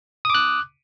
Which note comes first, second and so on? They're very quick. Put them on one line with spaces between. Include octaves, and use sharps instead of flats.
D#6 D6 F#6